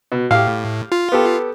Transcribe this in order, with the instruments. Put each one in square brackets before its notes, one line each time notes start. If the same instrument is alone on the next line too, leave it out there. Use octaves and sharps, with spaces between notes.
[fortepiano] B2
[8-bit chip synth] A2 [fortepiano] G4 F5
[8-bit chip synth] F4
[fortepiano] B3 G4 A4